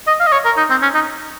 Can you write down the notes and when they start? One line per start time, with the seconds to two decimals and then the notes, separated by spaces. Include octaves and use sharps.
0.07 D#5
0.20 F5
0.27 D#5
0.32 C#5
0.45 A#4
0.57 D#4
0.70 C4
0.82 C#4
0.95 D#4